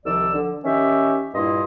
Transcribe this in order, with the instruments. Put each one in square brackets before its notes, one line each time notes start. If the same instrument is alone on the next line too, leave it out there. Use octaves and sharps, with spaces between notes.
[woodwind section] C2 D#3 F3 D5 E6
D3 F3
D#3 C#4 G4 E5
G2 A#2 E4 D#5 C6